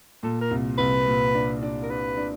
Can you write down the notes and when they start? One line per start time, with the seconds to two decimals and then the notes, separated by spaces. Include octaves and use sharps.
0.23 A#2 A4
0.41 A#4
0.51 C2
0.78 C2 B4
1.07 A#2
1.35 D4
1.63 D4
1.83 A#4
1.90 D4 B4
2.17 D4